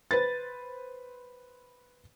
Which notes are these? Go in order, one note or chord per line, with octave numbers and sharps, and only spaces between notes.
B4 C5 A6